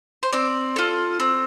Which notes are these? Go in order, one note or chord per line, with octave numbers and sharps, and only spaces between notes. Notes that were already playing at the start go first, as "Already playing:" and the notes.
C5
C4 D5
F4 A4
C4